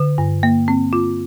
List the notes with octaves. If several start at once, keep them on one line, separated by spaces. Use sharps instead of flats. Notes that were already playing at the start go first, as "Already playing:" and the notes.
Already playing: D3
G2
A#3
C4
F4